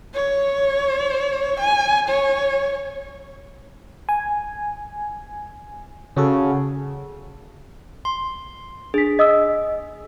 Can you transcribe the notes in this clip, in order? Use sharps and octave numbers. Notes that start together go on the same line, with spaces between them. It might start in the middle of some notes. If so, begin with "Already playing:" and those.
C#5
G#5
C#5
G#5
C#3 C#4 F#4 A4
C6
D4 G#4 B6
D#5 D#6 E6